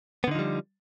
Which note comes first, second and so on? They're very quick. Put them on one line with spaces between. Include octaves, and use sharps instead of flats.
B3 D3 D#4 F3 G3